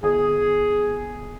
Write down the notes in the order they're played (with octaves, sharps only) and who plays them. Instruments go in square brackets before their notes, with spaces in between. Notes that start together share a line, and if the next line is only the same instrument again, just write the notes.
[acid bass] G1 [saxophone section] G#4